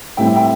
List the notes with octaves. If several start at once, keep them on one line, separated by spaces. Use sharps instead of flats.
A2 G3 C4 E5 G5
E5 G5